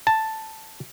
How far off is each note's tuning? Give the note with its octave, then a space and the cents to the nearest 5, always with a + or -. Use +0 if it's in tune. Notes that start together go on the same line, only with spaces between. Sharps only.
A5 +5